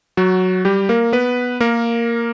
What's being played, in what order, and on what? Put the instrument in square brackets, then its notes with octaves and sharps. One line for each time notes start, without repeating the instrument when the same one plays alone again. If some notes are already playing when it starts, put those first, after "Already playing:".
[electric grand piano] F#3 F#4
G3 G4
A#3 A#4
B3 B4
A#3 A#4